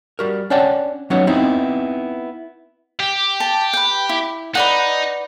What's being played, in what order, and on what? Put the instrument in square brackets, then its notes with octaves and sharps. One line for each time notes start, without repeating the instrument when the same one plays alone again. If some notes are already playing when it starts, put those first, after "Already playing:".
[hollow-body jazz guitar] G3 F#4 A#4
C#4 D4 D5 F#5 G5 A5
F#3 B3 C#4 D#4 F#5
B3 C4 D#4 E4
[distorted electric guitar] G4
[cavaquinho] A5
B4 G5
E4
[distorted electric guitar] D#4 [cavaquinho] B4 D5 F#5